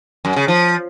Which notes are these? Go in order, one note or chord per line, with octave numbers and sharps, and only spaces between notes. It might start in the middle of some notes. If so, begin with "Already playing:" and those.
F#2
C#3
F3